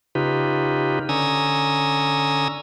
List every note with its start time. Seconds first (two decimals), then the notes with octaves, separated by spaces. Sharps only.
0.15 C#3 D#4 F4 G4 B4
1.09 D3 C#4 G#5 A#5 D#6 E6